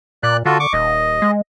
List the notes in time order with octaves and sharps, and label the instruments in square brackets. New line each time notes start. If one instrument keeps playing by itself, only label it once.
[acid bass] A#2 [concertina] D5 F#6
[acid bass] D3 [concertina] F4 F#4 A4
[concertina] C#6 D6
[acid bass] D#1 [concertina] D#5
[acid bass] G#3